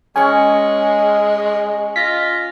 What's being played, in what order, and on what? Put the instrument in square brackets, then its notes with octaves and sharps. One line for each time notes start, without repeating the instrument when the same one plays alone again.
[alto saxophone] G#3 [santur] C#4 C#5 [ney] D#5 [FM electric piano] G#5
[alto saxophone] F4 [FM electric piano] A#6 B6